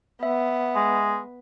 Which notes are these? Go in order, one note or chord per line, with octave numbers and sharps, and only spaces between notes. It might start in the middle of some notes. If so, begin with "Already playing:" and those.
B3 E5
G#3